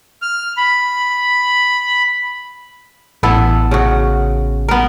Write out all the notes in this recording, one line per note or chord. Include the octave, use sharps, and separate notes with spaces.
F6
B5
A1 B3 E4 A4
C#3 F#4
B3 A#4